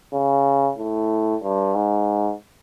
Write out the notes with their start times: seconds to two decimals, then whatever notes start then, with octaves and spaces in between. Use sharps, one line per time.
0.13 C#3
0.78 A2
1.43 G2
1.75 G#2